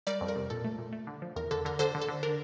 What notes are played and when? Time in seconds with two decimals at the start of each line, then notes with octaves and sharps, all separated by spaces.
0.07 G3 A#4 D5
0.21 F2
0.28 A#4
0.35 C3
0.50 A#2 A4
0.64 A3
0.78 A#2
0.93 A3
1.07 D3
1.22 F3
1.36 E2 A#4
1.51 D3 A4
1.65 D3 A#4
1.79 D3 A4 C5
1.95 D3
2.01 A4
2.08 D3
2.23 D4 A#4